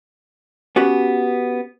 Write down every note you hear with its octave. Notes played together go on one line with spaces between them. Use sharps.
B3 C#4 F#4 G4 B4